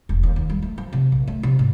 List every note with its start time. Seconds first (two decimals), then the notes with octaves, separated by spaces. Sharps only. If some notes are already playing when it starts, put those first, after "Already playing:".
0.09 E1
0.23 D#2
0.36 D#2
0.49 G3
0.62 A3
0.78 F3
0.93 C3
1.12 A#1
1.27 A3
1.43 C3
1.59 G#2